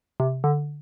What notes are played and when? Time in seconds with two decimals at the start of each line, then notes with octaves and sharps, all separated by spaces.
0.20 C3
0.44 D3